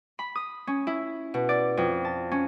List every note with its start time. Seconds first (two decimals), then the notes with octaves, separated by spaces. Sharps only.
0.19 B5
0.35 D#6
0.67 C#4
0.87 E4
1.34 B2
1.49 D5
1.77 F2
2.05 A5
2.32 C#4